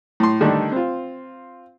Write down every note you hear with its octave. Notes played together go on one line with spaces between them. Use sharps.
A2 C6
D3 D#3 G3 A3 D4
C4 F4